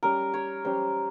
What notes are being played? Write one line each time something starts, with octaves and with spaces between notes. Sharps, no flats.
G3 C#4 G4 A#4
C#5
G3 C#4 G4 C5